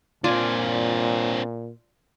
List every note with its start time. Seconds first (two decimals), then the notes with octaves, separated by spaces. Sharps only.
0.24 A#2 C4 D4 F4 D5 G#5